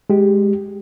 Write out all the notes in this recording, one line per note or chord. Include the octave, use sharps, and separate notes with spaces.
G#3 G4